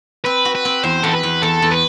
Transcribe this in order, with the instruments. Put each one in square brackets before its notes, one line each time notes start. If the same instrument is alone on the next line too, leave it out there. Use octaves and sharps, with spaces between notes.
[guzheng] C4 [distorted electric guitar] B4
[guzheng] F#4
[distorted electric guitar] B4
[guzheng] C4
[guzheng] E2 [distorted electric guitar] C5
[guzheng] E2 [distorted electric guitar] A4
[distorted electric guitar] B4
[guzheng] E2
[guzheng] E2 [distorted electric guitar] A4
[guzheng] E2
[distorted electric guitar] B4